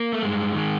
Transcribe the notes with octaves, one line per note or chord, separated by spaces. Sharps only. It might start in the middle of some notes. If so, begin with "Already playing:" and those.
Already playing: A#3
A3
G2 G#3
D#3 G#3